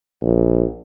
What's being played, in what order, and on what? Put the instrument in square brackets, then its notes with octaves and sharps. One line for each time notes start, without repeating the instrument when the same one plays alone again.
[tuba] A#1